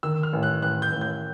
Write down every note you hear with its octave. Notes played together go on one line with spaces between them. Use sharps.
D#3 E6
F6
A1
F#6
A1 F#6
G6
A1
G6